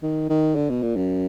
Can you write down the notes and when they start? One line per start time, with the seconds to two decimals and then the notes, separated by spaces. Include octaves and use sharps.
0.03 D#3
0.29 D#3
0.55 D3
0.69 B2
0.82 A#2
0.96 F#2